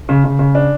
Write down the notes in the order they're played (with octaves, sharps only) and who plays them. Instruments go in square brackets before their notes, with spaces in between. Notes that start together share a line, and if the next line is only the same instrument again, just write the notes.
[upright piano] C#3
C#3
C#3
D4